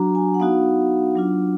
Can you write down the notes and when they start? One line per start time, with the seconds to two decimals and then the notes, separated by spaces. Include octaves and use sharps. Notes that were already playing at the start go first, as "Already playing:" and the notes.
Already playing: F#3 D4 F#4 A#5
0.15 G#5
0.34 F#5
0.40 B3 D#4 F#4 F5
1.15 F#3 D4 F4